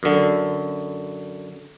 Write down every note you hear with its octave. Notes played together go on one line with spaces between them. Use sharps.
F#2 D3